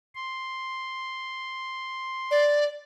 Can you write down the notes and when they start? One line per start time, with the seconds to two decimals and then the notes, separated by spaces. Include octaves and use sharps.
0.15 C6
2.31 D5